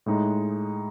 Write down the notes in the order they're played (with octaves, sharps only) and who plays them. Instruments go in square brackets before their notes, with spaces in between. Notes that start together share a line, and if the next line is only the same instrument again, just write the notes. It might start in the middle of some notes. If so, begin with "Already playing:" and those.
[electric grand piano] A2 G#3 D#4